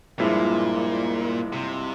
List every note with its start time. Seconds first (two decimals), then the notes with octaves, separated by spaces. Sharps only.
0.19 G2 A#2 F3 G#3 E4
1.53 C3